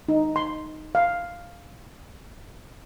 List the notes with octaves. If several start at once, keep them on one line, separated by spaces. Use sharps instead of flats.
D#4
C6
F5